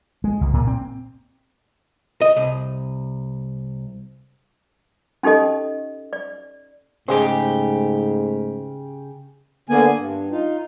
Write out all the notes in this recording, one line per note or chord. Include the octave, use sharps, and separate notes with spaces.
G#3
C#2
A#2
C4
D#5
C2
C#4 D#4 G4 A4 D#5
D5
G#2 C#3 G#3 A3 G4 G#4 C5
D3 A#3 B3 G#5
G2
D#4 F4